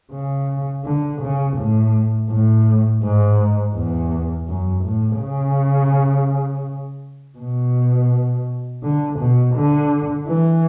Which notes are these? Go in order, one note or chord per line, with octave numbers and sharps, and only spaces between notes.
C#3
D3
C#3
A2
A2
G#2
E2
F#2
A2
C#3
B2
D3
B2
D3
E3